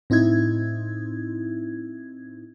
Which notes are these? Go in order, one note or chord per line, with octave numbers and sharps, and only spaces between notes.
A2 C4 D#4 E4 G#6